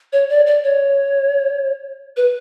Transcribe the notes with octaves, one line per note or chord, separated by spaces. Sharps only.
C#5
D5
D5
C#5
B4